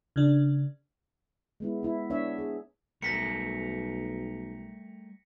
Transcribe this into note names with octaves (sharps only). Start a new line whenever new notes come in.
C#3 D4
G#3 B3 E4
B3 E4
B3 D4 C#5 E5
G#4
B1 G3 A3 A#4 A#6 B6 C#7